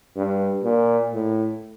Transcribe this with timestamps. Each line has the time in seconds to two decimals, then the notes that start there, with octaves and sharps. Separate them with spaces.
0.17 G2
0.64 A#2
1.13 A2